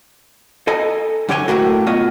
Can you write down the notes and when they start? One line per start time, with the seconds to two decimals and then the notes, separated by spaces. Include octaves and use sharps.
0.67 A4 D#5 G#5 A#5
1.29 F#2 D3 G4 C#5 G5 G#5
1.48 F#2 A2 A3 A#3 F#4
1.87 B2 F4 C#5 D#5